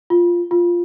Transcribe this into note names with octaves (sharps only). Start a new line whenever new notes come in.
F4
F4